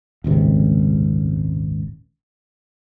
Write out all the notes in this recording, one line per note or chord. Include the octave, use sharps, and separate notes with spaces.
D#1 G#1 C#2 C3